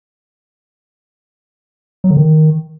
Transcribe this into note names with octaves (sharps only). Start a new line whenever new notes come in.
F#3
D3
D#3